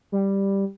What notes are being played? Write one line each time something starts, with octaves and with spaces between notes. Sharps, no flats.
G3